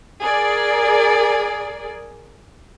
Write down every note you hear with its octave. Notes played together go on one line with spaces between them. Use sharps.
G#4 A#4 D5